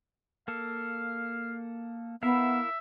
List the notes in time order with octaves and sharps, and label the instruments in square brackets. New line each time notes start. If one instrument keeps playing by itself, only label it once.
[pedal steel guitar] A#3 A4 [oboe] F5
[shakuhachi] B3 [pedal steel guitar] E4 A#4 F5 [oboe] E5